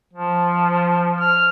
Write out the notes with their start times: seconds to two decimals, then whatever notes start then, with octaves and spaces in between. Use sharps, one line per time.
0.13 F3
1.20 F6